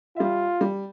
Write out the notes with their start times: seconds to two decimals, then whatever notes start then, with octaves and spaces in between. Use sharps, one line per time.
0.16 G3 F4 E5
0.61 G3